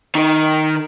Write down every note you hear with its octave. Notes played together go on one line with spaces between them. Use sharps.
D#3